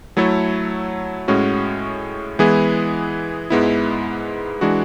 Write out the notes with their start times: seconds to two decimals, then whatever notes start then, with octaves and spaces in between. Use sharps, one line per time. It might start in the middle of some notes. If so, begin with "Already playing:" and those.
0.17 F#3 A3 E4 A4 C#5
1.28 A2 G#3 C#4 F#4
2.39 E3 G#3 B3 E4 G#4
3.50 G#2 G#3 B3 E4
4.61 E3 G#3 D4 F#4